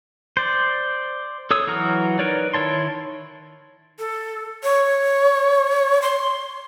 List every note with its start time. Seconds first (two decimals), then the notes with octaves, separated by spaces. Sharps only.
0.37 C5 D5
1.51 A4 C#5 D#6 E6
1.67 E3 F#3 F#4 A#5 F6
2.19 D#4 A#4 B4 C#5 D5
2.54 D#3 E4 C#5 A5 C6
3.99 A4
4.63 C#5
6.02 C6